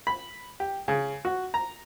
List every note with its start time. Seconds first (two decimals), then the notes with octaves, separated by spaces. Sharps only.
0.07 B5
0.60 G4
0.88 C#3
1.25 F#4
1.54 A#5